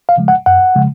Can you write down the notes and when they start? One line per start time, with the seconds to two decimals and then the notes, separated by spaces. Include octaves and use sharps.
0.09 F5
0.18 C#3 F3 G#3
0.28 F#5
0.46 F#2 F#5
0.75 C#3 F3 G#3